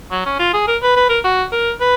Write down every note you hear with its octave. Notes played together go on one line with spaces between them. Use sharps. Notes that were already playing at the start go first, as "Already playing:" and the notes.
F#3
C#4
F4
G#4
A#4
B4
B4
A#4
F#4
A#4
B4